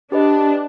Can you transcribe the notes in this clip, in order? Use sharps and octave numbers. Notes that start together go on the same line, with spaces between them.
D4 G4 B4 D#5